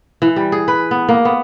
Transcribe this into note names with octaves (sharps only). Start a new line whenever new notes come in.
E3
G3
G#4
B4
B3
A#3
B3